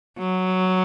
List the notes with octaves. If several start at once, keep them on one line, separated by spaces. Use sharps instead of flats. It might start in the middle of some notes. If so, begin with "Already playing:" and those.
F#3